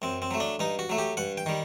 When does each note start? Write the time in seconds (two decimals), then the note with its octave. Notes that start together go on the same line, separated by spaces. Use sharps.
0.02 F#2 C4
0.22 C4
0.31 F#3 A3
0.40 D4
0.59 G2 D#4
0.79 F#4
0.89 F#3 A3
0.98 G4
1.17 G2 F#5
1.37 G5
1.46 D#3 G3